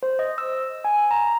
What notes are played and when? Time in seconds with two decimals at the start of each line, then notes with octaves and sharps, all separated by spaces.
0.03 C5
0.19 D#5
0.38 E6
0.85 G#5
1.11 A#5